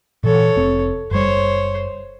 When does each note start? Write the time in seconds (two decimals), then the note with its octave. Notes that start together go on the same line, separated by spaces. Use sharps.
0.24 A#2 E3 A4 C#5
0.56 F1 C4
1.11 F#1 G3 C5 C#5